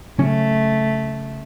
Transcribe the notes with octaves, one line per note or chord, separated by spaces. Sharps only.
C#3 F#3 A3 C#4